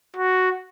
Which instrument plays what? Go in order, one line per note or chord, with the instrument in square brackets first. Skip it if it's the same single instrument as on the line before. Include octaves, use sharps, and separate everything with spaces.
[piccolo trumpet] F#4